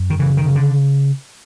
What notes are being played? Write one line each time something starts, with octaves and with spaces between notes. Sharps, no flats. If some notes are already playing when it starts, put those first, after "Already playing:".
Already playing: F#2
D#3
C#3 E3
D#3
C#3
D3